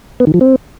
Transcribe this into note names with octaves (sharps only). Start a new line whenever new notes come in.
B3
D#3
F3
C4